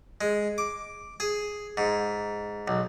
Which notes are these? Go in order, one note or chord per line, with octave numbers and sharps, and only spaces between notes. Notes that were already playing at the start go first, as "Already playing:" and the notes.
G#3
D6
G#4
G#2
B1